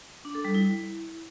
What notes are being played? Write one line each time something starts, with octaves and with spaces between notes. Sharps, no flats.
D4
A4
G3
E4